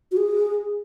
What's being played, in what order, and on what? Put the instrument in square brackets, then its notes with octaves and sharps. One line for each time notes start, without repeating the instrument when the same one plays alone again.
[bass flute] F#4
G#4